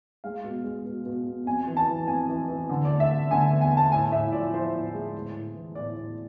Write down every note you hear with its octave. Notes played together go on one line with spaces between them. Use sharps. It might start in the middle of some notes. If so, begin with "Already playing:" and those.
G#3 F5
B2
G#3
B2
B2
B2
F2 G#5
E3
A5
E3
F2 G#5
E3
E3
D3
D5
A3
E5
A3
D3 G#5
E2
G#5
A3
A5
A2 G#5
A2 E5
F3 D5
F3 C5
A2
G#3
A2
A2
E3
A2 D5
A2